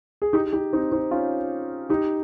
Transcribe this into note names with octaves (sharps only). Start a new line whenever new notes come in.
G#4
D#4 G4
D#4 G4
C4 D#4
C4 D#4
C#4 F4
D#4 G4